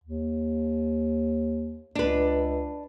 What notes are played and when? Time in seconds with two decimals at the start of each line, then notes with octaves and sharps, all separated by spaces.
0.04 D#2
1.95 C#2 D4 B4